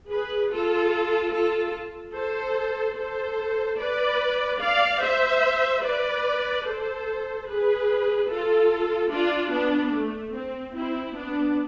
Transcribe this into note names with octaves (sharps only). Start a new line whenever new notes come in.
G#4 B4
F4 A4
F4 A4
A4 C5
A4 C5
B4 D5
D5 F5
C5 E5
B4 D5
A4 C5
G#4 B4
F4 A4
D4 F4
B3 D4
A3
C4
C4 E4
B3 D4